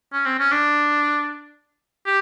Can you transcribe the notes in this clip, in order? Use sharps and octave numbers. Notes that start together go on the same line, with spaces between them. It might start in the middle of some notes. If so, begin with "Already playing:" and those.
C#4
C4
C#4
D4
G4